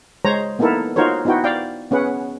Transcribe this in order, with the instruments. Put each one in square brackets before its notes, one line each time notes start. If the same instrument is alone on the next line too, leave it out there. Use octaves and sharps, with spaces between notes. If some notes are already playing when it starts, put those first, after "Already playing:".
[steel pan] G#3 C5 C#5 A#5
A#3 B3 D#4 E4 A4 A#4
D#4 F4 F#4 A#4 C5 C#5
B3 D#4 E4 F#4 G5
D5 F5 G5
B3 C#4 G#4 B4 F#5